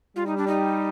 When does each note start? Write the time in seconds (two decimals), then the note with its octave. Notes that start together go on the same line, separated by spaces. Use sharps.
0.16 G3 F4
0.27 D#4
0.38 D4
0.48 D#4